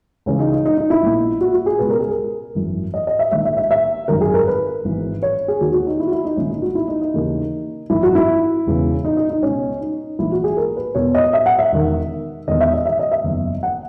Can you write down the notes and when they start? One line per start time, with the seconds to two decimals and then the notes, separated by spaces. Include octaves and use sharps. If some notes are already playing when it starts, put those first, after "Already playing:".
0.26 C#2 C#3 E3 C#4
0.39 D#4
0.52 D#4
0.65 D#4
0.78 D#4
0.90 E4
1.03 A#1 A#2
1.41 F#4
1.54 F#4
1.66 G#4
1.79 C#2 B2 B4
1.90 A#4
2.00 G#4
2.10 A#4
2.55 G#1 F#2 E3
2.94 D#5
3.07 D#5
3.19 E5
3.31 A#1 G#2 D#3 E5
3.45 E5
3.57 E5
3.71 E5
4.08 G#1 F#2 D#3 A#4
4.21 G#4
4.34 A#4
4.47 B4
4.85 G#1 G#2 E3
5.23 C#5
5.48 G#4
5.61 D#2 D#3 F#4
5.74 F#4
5.87 D#4
6.00 E4
6.07 F#4
6.12 E4
6.25 D#4
6.37 A#1 G#2 D#3 C#4
6.50 D#4
6.62 F#4
6.75 E4
6.88 D#4
7.01 D#4
7.14 D#2 C#3 E3
7.90 G#1 F#2 E3 E4
8.03 F#4
8.15 E4
8.66 E1 E2 C#3 E3
9.05 D#4
9.17 D#4
9.30 D#4
9.43 C#2 B2 C#4
9.81 D#4
10.19 A#1 G#2 E3 E4
10.32 F#4
10.44 G#4
10.57 A#4
10.76 B4
10.95 E1 E2 B2 C#5
11.15 D#5
11.33 E5
11.46 F#5
11.59 E5
11.72 E1 E2 D#3
12.48 E1 E2 D#3 D#5
12.60 E5
12.73 D#5
12.86 E5
12.99 D#5
13.12 E5
13.24 F#1 E2 D#3
13.63 F#5